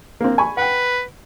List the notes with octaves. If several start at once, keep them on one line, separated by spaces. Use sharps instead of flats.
A#3 C4
G#5 B5 C#6
B4 F#5 G5